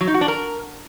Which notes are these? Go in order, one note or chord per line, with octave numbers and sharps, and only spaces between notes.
F#3
D#4
F#4
D4
A#4